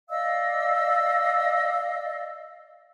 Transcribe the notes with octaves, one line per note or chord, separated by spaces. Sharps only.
D5 D#5 F5 E6